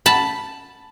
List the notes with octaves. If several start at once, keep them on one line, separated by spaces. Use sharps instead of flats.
A5 B5